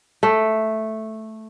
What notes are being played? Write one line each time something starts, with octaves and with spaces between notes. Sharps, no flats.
A3